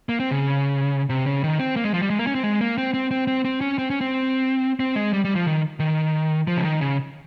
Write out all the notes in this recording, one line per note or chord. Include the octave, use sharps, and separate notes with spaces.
A#3
C4
C#3
C3
C#3
D#3
C4
A#3
G#3
F3
G3
G#3
A#3
C#4
C4
G#3
A#3
C4
C4
C4
C4
C4
C#4
C4
C#4
C4
C4
G#3
G3
G3
F3
D#3
D#3
F3
C#3
D#3
C#3